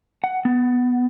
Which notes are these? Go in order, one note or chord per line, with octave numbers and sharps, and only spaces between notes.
F#5
B3